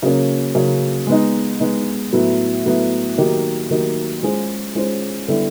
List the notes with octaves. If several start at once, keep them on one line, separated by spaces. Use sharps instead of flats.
C#3 F#3 A#3 C#4
C#3 F#3 A#3 C#4
G#3 B3 D#4
G#3 B3 D#4
A2 F#3 B3 E4
A2 F#3 B3 E4
D#3 F#3 A#3 D#4 G4
D#3 F#3 A#3 D#4 G4
G#3 C#4 F4 G#4 C5
G#3 C#4 F4 G#4 C5
D3 G3 B3 E4 A4